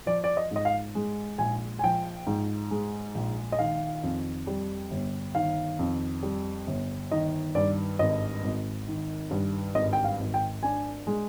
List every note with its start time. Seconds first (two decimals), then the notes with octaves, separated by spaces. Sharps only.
0.06 F3 D5
0.24 D5
0.37 D#5
0.51 G#2 D#5
0.65 F5
0.95 G#3
1.38 A#1 G#5
1.79 G#5
1.84 F3 G5
2.27 G#2
2.71 G#3
3.15 A#1
3.52 D#5
3.59 D#3 F5
4.03 F2
4.47 G3
4.91 G1
5.35 D#3 F5
5.79 F2
6.23 G3
6.67 G1
7.11 D#3 D#5
7.55 G2 D5
7.99 G#1 D#5
8.44 G#1
8.88 D#3
9.31 G2
9.75 G#1 D#5
9.93 G5
10.04 F5
10.20 G#1
10.34 G5
10.63 D4 G#5
11.07 G#3